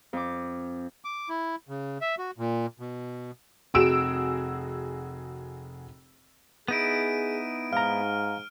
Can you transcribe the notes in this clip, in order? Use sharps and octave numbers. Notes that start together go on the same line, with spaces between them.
F2 D6
D6
E4
C#3
E5
F#4
A#2
B2
F1 F#4 G#4 E6 D7 E7
B3 D#4 E4 G#4 D7 D#7
G#2 F5 A#5 F6